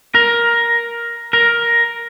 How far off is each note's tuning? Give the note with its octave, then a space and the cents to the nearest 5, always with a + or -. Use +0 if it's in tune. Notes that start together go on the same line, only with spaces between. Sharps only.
A#4 +10
A#4 +10